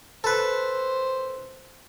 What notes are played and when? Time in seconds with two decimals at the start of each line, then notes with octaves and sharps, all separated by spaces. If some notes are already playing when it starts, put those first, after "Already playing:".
0.24 A4 B4 C5